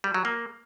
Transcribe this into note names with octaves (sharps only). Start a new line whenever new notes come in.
G3
F#3
A#3